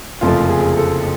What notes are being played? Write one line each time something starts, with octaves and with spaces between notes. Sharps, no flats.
F#1 F2 C3 F3 A3 F4
G#4
A4